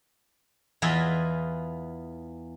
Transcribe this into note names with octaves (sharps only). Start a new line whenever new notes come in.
E2 E3 E4 F4 D#5 G#5